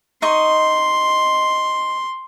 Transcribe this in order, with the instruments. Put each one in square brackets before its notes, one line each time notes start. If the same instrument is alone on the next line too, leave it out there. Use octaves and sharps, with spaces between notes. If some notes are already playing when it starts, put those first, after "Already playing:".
[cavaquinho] D#4 D#5 C#6 [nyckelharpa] C6